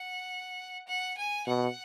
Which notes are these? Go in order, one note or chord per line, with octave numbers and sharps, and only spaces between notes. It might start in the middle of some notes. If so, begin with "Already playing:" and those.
Already playing: F#5
F#5
G#5
B2 F#5